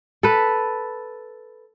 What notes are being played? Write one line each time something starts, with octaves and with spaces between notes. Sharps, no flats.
A4 B4